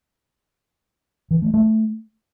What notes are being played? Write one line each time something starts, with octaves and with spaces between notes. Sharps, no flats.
E3
A3
A3